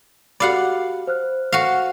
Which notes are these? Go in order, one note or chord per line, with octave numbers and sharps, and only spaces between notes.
F#4 G4 D5 F5 F#5 B5
C5 F6 F#6
F#4 F5